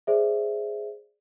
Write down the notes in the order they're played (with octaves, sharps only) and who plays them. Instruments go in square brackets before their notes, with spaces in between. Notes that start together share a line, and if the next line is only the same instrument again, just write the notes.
[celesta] G#4 C5 D5 E5